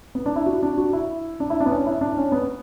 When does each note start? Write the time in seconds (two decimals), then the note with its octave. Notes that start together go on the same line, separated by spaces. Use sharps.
0.15 B3
0.26 D4
0.36 E4
0.46 F#4
0.63 D4
0.78 F#4
0.93 E4
1.40 D4
1.50 E4
1.60 D4
1.66 B3
1.71 C#4
1.87 E4
2.01 D4
2.17 C#4
2.32 B3